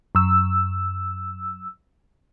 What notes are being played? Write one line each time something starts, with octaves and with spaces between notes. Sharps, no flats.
F#2 E6